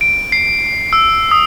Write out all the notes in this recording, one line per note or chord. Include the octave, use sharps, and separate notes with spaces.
D7
C7
E6
D#6